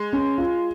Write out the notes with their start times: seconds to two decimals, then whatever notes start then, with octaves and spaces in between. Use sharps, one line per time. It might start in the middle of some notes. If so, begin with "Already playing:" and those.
Already playing: G#3
0.13 C#4
0.38 F4